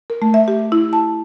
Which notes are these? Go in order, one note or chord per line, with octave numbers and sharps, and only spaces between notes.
A#4
A3
E5
G4
E4
A5